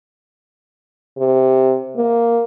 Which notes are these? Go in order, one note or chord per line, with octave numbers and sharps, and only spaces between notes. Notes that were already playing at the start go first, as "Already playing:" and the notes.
C3
A#3